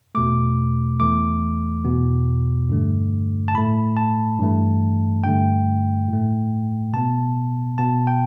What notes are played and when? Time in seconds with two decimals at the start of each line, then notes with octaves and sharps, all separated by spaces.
0.15 E2 B2 A3 D6
1.00 E2 E3 A3 D6
1.85 E2 B2 B3
2.69 G2 D3 A3
3.48 A5
3.54 A2 A3 B5
3.97 A5
4.39 G2 E3 A3
5.23 G2 D3 A3 G5
6.08 A2 A3
6.93 B2 B3 A5
7.78 B2 B3 A5
8.07 G5